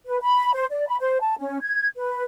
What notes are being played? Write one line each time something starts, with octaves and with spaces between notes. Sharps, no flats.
B4
B5
C5
D5
B5
C5
A5
C#4
G#6
B4